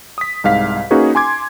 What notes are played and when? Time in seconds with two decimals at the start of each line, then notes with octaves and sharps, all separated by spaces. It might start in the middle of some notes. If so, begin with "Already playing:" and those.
0.18 D#6 B6
0.44 C2 G#2 F5 B6
0.91 A#3 C#4 D#4 F#4 G#4 B4
1.15 G#5 C6 D6 G#6